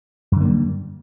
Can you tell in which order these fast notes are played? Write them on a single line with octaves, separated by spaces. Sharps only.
F#2 D3 A#3 G3